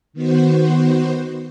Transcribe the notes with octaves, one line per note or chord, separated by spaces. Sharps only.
D#3 B3 F#4 C5